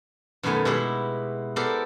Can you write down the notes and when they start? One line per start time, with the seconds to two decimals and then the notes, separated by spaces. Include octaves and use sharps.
0.43 F#2 B2 D#3 A3 B3 G#5
0.65 B2 G#3 E4 G4
1.56 B3 G4 A4 A#4 C5 D5